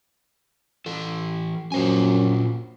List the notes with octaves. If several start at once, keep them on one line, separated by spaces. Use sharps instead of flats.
E3 A4
F#2 A#2 C5 G#5